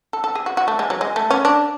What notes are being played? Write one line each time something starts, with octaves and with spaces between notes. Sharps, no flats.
A4
A4
G#4
F#4
F#4
A3
G#3
F#3
G#3
A3
C#4
D4